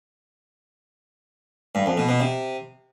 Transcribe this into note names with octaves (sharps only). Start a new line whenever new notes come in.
G2
F2
B2
B2
C3